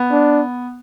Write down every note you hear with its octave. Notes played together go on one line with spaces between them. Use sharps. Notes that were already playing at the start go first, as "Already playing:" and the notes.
Already playing: B3
D4